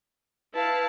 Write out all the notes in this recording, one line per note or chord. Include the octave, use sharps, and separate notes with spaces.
E4 B4 F5 A5